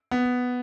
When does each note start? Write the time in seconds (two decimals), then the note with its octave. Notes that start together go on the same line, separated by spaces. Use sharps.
0.11 B3